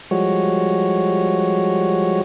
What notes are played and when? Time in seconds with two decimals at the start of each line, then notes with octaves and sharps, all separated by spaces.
0.11 F3 G3 G#3 F#4 C#5